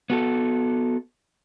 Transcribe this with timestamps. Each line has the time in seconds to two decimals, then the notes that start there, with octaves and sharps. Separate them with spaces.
0.10 B3 F#4 A4